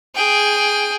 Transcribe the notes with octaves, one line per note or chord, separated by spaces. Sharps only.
G#4 G5